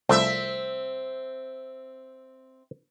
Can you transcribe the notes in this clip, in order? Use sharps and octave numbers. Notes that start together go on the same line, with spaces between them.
C2 F3 A3 C4 E5